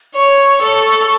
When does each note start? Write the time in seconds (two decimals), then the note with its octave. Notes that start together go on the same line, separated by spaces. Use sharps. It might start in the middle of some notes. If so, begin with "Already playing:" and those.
0.16 C#5 C#6
0.62 A4